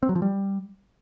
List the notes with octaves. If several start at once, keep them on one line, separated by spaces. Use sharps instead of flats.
C4
F#3
F3
G3